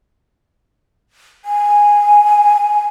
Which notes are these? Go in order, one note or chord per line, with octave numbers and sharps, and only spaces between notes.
G#5